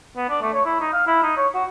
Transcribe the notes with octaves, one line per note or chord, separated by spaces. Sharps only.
B3
D4
A3
C#5
E4
D#4
F5
E4
D#4
C#5
F#4